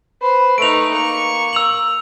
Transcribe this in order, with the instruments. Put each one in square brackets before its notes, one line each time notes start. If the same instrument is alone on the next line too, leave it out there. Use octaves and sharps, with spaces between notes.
[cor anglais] B4 [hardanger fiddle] C5
[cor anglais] A3 [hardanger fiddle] D#4 B4 [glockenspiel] D7 F7
[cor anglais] A#3 [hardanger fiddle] C#6
[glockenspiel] E6 F7 F#7